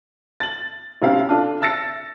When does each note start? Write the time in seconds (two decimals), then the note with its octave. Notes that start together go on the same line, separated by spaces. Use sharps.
0.40 A6 F#7
1.02 B1 C3 C#4 E4 G4 F5
1.29 D4 F4 A4 D5
1.61 E5 A5 E6 A6 A#6 C#7